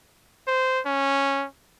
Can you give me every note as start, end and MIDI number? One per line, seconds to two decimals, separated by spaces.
0.48 0.80 72
0.86 1.46 61